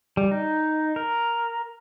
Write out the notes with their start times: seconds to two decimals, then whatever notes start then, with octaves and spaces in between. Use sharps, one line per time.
0.17 G3
0.31 D#4
0.96 A#4